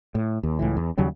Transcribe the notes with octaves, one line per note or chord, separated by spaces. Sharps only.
A2
D#2
C#2 A2 E3
E2
D#2 C#3 F#3 G3